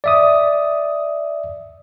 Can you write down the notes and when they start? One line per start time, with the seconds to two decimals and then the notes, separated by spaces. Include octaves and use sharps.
0.04 D5 E5 D#6